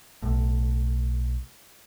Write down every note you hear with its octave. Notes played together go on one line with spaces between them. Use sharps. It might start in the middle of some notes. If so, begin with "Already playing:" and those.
B1 A2